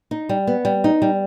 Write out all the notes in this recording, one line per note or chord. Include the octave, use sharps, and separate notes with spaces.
D#4
G3
B3
G3
D#4
G3